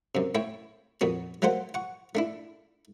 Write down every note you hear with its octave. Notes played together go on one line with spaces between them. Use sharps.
F#2 C3
A2 E4 C#5 G5
F2 A#2 B3 F#4
F#3 A3 A#3 C5 F#5
F#5 C#6
A3 D4 E4